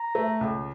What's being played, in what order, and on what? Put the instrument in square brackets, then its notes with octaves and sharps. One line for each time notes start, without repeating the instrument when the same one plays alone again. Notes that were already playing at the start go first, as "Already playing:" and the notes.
Already playing: [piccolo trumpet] A#5
[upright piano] A3
C#2